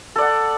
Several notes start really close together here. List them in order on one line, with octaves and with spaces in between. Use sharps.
A4 D5 F#5